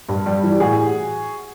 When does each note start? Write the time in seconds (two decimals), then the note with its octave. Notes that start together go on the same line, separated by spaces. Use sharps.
0.09 G2
0.26 G3
0.43 E3
0.52 G4
0.60 A2 F#4 G#4